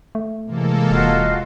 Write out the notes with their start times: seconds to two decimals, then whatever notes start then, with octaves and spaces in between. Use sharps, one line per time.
0.15 A3
0.47 C3 E3 G#3 A#3 A4
0.91 D#1 F4 F#4 D#5